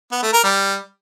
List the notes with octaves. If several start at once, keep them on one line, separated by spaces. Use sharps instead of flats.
B3
A3
A#4
G3